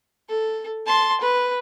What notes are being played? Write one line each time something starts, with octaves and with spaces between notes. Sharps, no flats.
A4
A5 C6
B4